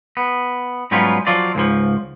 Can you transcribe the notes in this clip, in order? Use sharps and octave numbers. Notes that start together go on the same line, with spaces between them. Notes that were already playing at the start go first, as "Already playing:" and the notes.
B3
G#2 F#3 G3 B3 C#4 F4
F3 F#3 F4 D5
C#2 G#2 C#3 F3